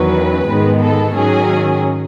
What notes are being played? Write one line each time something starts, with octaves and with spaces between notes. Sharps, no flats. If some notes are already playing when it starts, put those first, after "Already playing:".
Already playing: E2 D#3 F#3 C#4 B4
G#2 D#3 G#3 B3
A4
G#2 D#3 F#3 C#4 G#4